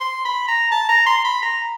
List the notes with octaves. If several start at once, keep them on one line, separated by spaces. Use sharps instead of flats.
C6
B5
A#5
A5
A#5
C6
B5
A#5